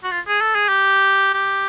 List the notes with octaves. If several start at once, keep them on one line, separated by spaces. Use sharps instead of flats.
F#4
F4
G#4
A4
G#4
G4
G4